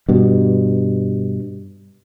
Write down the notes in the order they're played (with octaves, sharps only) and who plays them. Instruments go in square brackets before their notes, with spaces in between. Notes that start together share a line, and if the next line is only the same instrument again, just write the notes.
[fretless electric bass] G2 B2